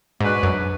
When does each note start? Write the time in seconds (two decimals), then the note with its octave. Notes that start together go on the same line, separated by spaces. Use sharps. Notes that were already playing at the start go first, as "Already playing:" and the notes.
0.21 G#2 G#3 D4 F#4 B4
0.43 F#2